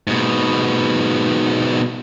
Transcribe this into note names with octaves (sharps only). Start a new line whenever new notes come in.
G#2 B2